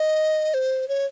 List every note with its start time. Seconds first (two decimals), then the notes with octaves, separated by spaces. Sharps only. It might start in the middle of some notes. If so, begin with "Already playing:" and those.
Already playing: D#5
0.54 C5
0.88 C#5